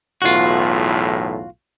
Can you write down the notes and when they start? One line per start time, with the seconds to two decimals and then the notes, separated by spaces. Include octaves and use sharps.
0.22 B1 E2 A2 F4 F#4